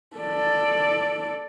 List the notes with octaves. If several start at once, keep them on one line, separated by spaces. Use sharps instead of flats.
A4 D5